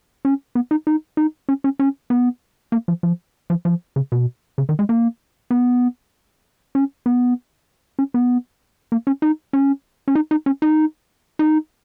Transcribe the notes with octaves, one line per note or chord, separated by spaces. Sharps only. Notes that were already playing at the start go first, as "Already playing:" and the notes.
C#4
B3
D#4
D#4
D#4
C#4
C#4
C#4
B3
A#3
F3
F3
F3
F3
C#3
B2
C#3
D#3
G#3
A#3
B3
C#4
B3
C#4
B3
A#3
C#4
D#4
C#4
C#4
D#4
D#4
C#4
D#4
D#4